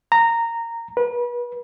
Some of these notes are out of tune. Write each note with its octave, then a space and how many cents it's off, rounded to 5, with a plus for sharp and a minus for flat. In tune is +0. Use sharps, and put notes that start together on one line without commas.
A#5 -15
B4 -35